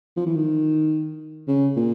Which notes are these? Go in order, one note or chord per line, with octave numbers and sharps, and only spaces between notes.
F3
E3
D#3
C#3
A#2